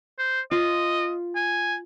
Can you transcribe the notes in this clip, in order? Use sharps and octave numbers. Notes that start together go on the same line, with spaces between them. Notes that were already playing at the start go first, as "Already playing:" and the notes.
C5
F4 D#5
G#5